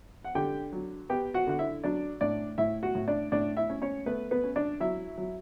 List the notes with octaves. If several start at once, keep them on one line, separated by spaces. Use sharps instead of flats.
F#5
D3 G4 G5
F#3
B3 G4 G5
F#4 F#5
D3 F#5
E4 E5
F#3 D4 D5
A2 D4 D5
A2 E4 E5
F#4 F#5
A2
D4 D5
A2 D4 D5
E4 E5
C#4
C#4 C#5
A3 B3 B4
B3 B4
C#4
D4 D5
F#3 E4 E5
F#3